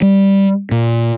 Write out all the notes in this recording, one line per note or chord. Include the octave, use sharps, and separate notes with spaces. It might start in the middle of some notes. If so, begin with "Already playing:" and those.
G3
A#2